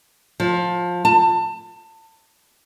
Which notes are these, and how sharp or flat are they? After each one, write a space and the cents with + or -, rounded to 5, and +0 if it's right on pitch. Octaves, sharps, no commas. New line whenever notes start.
F3 +20
A5 +25